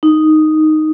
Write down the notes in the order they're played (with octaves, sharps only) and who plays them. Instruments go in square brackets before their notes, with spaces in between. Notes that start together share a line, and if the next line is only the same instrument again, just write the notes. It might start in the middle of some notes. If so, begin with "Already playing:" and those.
[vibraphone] D#4